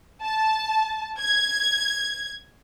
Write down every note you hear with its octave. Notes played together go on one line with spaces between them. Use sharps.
A5
G#6